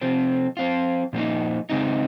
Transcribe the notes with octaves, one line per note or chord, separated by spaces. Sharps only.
C3 F3 C4
F3 C4 F4
A#2 F3 A#3 D#4
C#3 G#3 C4 D#4